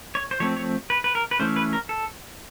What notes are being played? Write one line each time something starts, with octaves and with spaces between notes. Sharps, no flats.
C#5
C5
F3 A3 C4 C#5
C#5
B4
B4
A#4
B4
E3 A3 C#4 C5
B4
A#4
A4